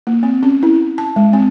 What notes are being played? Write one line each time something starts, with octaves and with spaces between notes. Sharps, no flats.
A#3
C4
C#4
E4
A5
G#3
C4